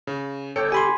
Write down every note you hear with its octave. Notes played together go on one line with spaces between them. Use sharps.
C#3
G1 A4 C#5 G5 C#7
G4 G#5 B5 C6